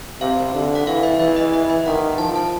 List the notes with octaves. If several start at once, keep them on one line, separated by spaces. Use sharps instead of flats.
C3 F5
D3
F#5
E3 F5
E5
E3 E5
D#5
D#5
E5
D#3 F#5
F3 A5
A5